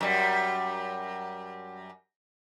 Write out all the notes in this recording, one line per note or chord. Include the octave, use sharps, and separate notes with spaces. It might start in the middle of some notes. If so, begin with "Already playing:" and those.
F#2 G3